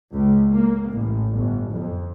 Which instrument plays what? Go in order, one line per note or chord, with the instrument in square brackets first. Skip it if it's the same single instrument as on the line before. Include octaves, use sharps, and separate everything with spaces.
[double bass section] C#2
A#3
A1
G1
F2